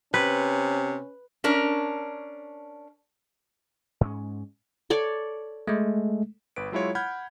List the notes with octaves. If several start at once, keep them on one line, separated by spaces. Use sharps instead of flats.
C3 C#4 B4
C#4 D4 A#4
G#2 G#3 C#4
A4 C#5 D5
G#3 A3
G1 B4 D7
F#3 G#3 E4 F4 C#5
F#5 B5 F6 G6 G#6